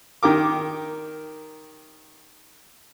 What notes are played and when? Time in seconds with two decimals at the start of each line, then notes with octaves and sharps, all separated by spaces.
0.23 D#3 G4 A#4 D6